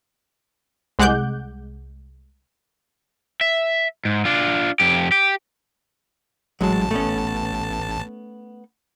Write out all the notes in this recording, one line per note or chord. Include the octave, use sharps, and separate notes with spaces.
C2 G#3 F#5 D6 F#6 G6
E5
G#2
D4 F4
F2 G4
G4
A1 F#3 G#3 A5
A3 B3 C#4